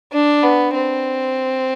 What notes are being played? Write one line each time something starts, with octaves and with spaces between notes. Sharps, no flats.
D4
B3
C4